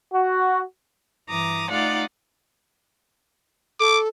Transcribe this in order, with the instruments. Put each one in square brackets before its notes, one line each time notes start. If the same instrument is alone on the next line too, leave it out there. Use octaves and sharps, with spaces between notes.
[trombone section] F#4
[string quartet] G2 E3 A#5 D6 D#6
A3 D#4 F4 D5 F#5
[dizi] A4 [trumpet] D6